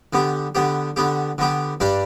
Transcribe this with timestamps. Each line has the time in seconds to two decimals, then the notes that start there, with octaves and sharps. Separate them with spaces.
0.13 D3 B3 G4
0.55 D3 B3 G4
0.96 D3 B3 G4
1.38 D3 B3 G4
1.80 G2 G3 D4 G4